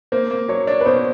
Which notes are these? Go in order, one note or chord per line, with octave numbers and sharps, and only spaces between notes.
A#3 C5
A#3
F#3 C#5
D4 C#5
B4
B2 C5